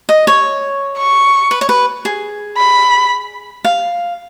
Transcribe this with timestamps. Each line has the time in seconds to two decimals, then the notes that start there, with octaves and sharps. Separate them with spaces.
0.09 D#5
0.27 C#5
0.98 C#6
1.51 B4
1.61 C#5
1.69 B4
2.05 G#4
2.57 B5
3.65 F5